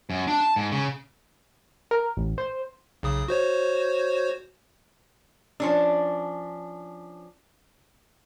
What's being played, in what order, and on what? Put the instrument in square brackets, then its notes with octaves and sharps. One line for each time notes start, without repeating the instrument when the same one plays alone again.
[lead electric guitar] F#2
D4
A5
G#2
C#3
[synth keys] A#4
A1
C5
[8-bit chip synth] B1 C#3 D#6
F#4 C5 C#5
[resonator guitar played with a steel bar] F3 C#4 D4